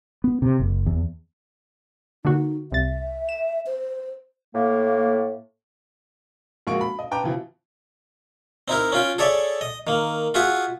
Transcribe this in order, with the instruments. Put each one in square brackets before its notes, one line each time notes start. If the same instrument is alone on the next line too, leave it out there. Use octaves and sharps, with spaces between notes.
[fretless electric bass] B3
C3
F#1
E2
[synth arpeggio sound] D3 A#3 F#4 [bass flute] D#4
[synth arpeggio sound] C2 A6 [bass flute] E5
[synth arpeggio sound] E7
[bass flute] C5
[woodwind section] A2 A#3
[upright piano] A#1 G#3 A#3 F#4 C#6 D7
B5
D#5
B4 G5 A5 A#5 D6
B2 E3 F3
[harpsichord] C4 D#4 E4 A#4
C#4 F4 G5
G#4 A4 C#5 D5 E5
D#5
D#3 A#3
F4 F#4 G#4 E5 F#5